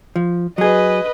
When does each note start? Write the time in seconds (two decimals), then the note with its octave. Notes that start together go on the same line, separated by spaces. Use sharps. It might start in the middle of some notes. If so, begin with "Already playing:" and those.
0.16 F3
0.58 F#3 G#4 B4 D#5